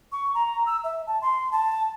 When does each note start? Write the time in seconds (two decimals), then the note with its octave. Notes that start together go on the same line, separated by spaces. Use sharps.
0.12 C#6
0.35 A#5
0.66 E6
0.84 E5
1.07 A5
1.22 C6
1.52 A5